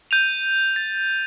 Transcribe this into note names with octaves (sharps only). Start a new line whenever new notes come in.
G6 D#7 F7
A6